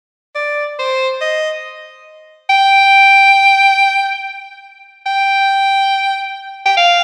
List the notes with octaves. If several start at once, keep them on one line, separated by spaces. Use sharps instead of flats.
D5
C5
D#5
G5
G5
G5
F5